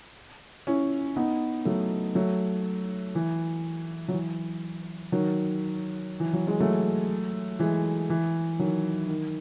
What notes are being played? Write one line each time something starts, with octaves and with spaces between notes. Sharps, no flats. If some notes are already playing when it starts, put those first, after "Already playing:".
C#4 E4
B3 D#4
F#3 A3
F#3 A3
E3
F#3
E3
D#3 F#3
E3
F#3
G#3
F#3 A3
E3 G#3
E3
D#3 F#3
D#3